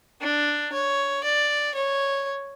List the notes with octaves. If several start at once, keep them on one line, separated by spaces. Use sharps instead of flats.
D4
C#5
D5
C#5